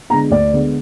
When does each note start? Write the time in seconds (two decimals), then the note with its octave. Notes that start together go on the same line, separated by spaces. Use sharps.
0.10 D3 G#3 B3 D4 A#5
0.30 D2 D5
0.53 D3 G#3 B3 D4